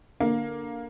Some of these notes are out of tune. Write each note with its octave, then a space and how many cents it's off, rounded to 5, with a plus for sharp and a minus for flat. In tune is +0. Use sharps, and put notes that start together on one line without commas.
D3 -5 A#3 +10